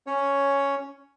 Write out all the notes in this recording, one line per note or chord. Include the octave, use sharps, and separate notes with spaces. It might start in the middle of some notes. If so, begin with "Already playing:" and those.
C#4 C#5